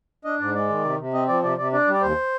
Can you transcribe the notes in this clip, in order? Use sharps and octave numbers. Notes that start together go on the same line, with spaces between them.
D4 D#5
G#2 D5
G#3 D5
D#3
C3
C3
C4 D#5
F3 D5
C3 D5
C3 D5
D4 D5
G3
D5
D#2 C5